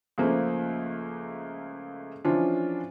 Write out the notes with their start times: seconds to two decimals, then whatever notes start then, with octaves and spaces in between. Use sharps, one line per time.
0.18 C#2 F3 A3 A#3
2.25 E3 F3 C#4 D4 F4